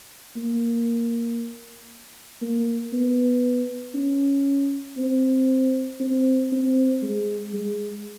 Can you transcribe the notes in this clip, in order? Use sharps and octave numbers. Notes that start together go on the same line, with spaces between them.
A#3
A#3
B3
C#4
C4
C4
C4
G#3
G#3